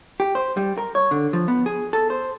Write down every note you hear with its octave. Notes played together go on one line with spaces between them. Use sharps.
G4
C5
G3
A#4
C#5
D3
F3
B3
G#4
A4
C5